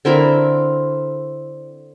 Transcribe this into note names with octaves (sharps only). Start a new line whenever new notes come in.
D3 C4 E4 A#4